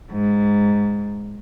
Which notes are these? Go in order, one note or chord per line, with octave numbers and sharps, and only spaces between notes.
G#2